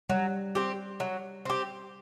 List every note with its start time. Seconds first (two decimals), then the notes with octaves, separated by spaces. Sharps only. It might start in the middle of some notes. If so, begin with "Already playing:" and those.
0.10 F#3 G3
0.55 C4 G4
1.00 F#3
1.45 C4 G4